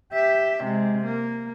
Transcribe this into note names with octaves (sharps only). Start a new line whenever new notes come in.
G4 E5
C3 G#3
A#3